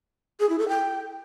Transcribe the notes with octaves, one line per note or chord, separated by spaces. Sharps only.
G#4
E4
A4
G5